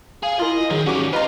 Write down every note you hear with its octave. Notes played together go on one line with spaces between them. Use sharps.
G#4 F5
E4 F4 A#4 D#5
D#3 F#3 G#4
C#4 D#4 F#4 G4 D6
F4 B4 D#5 F5 A#5